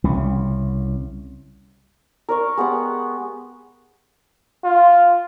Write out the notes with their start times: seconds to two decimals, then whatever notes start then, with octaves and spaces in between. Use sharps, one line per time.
0.04 C2 C#3
2.29 A#4 D5 C#6
2.57 G#3 B3 G4 F#5
4.64 F4